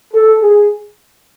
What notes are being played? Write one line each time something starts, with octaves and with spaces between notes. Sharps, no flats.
A4
G#4